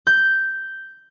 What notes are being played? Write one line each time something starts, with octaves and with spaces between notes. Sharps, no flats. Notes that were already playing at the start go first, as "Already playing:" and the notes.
G6